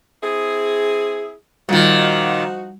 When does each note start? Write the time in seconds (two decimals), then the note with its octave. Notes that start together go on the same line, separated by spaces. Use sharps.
0.23 C4 E4 G#4
1.69 A#2 D#3 F3 G3 D#4 F4 F#4